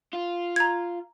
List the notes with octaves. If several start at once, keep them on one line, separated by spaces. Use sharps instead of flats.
F4
A#5 G#6